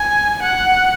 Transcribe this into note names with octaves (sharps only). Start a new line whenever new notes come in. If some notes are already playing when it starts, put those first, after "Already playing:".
Already playing: G#5
F#5